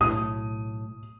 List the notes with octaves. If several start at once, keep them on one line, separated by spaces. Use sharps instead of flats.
B1 A2 D#6